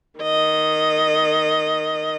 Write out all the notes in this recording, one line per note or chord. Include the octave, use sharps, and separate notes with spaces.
D#3 D#5